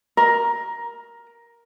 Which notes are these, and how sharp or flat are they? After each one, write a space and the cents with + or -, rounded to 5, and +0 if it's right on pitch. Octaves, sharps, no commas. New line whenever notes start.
A#4 +10